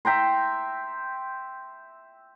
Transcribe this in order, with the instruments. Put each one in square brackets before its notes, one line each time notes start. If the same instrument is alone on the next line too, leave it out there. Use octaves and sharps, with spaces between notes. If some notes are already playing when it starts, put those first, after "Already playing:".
[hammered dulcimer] E5 G5 A#5 C6